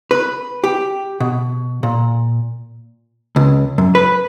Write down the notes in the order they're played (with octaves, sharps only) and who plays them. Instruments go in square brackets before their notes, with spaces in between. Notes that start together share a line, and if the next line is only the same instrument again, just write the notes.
[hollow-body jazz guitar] B4
G4
B2
A#2
C#2
F#2
B4